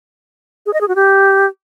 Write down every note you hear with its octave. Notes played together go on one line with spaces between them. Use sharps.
G#4
D#5
G#4
F#4
G4